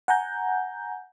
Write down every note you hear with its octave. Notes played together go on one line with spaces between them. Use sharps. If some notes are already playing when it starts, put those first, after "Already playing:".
F#5 G#5 A#5 G6